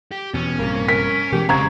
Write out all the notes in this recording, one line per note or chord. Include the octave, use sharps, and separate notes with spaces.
G4
E2 B2 C#4
A#1 G2 C3 A#3
A#4 B6
B2 E3 G#3 G4
F1 C#3 G#3 C4 G4 A#5 C#6 G#6